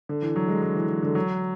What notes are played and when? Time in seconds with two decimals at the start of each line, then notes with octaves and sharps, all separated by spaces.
0.09 D3
0.22 E3
0.36 F#3
0.48 G#3
0.62 F#3
0.75 E3
0.89 E3
1.02 D3
1.15 F#3